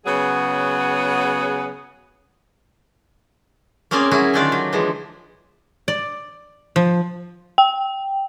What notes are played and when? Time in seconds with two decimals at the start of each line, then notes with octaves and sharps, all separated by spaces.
0.06 C#3 F#3 B3 G#4
3.91 A#3 C4 C#4 G#4 A#4 D5
4.11 F#3 C#4 E4 F#4 G#4
4.33 D3 D#3 A3 D4 F4 D5
4.52 F#3
4.73 E3 F3 G#3
5.88 D5
6.76 F3
7.58 G5